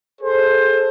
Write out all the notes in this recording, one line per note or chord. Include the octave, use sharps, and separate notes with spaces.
G#4 A4 C5